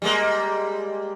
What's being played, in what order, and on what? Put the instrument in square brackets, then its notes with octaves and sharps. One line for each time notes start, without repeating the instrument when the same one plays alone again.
[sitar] G3 G#3 A#3